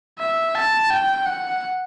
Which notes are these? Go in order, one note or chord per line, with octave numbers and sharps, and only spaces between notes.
E5
A5
G5
F#5